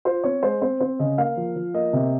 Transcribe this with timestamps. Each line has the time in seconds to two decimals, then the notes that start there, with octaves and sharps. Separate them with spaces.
0.05 F4 C5
0.24 C4 C#5
0.43 G#3 C5
0.62 C4 C5
0.80 C4 C5
0.99 C#3 D#5
1.18 A#3 F5
1.37 F3
1.56 F3
1.74 A#3 D#5
1.93 C3